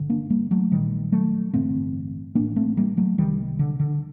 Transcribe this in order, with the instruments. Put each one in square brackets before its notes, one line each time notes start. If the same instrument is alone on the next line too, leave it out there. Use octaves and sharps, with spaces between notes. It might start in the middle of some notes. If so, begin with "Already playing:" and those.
Already playing: [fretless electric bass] G1 D3
A#3 D4
G3 A#3
F#3 A3
A#1 A#2 D#3 G3
F#3 A3
A1 G2 D3 A3 C4
A1 A2 A#3 D4
A3 C4
G3 A#3
F#3 A3
C2 C3 D#3 G3
D3
D3